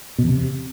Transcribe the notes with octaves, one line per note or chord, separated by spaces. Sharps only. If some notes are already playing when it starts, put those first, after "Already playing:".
B2
E2
C3